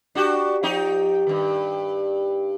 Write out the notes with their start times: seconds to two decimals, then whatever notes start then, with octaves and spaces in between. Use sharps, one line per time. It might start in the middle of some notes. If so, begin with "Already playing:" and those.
0.15 D4 F#4 G4
0.63 F3 D#4 G4
1.27 G2 D#3